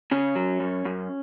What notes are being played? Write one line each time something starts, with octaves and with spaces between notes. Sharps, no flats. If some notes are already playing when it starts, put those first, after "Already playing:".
C#3 C#4
F#3
F#2
F#2